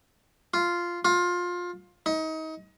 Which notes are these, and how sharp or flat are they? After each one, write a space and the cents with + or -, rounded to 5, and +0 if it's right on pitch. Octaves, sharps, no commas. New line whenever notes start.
F4 -5
F4 +20
D#4 +30